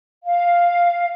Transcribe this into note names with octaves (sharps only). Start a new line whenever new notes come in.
F5